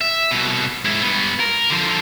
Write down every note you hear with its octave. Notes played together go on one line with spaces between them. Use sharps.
E5
C2 B2
G#2 E4
G2 B3
A#4
D3 F3